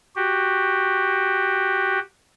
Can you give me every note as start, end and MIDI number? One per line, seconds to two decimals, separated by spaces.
0.16 1.99 66
0.16 1.99 67